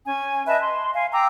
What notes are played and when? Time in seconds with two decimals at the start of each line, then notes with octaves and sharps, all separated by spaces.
0.06 C#4 G#5
0.46 B4 D#5 E5 A5
0.60 C6
0.94 F5 G#5
1.12 G5 A#5 D6 E6